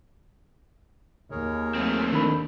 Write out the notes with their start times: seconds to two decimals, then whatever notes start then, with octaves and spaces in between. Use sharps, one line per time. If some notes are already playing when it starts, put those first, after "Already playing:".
1.31 D#2 G#4 A#4 C#5
1.75 A3 C4
2.12 D#3 D4 B5